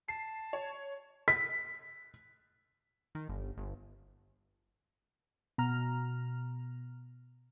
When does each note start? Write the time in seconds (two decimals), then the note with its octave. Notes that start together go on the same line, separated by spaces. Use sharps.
0.08 A5 C7
0.53 C#5
1.28 B6
3.15 D#3
3.29 G1
3.58 G1
5.58 B2 A#5 F6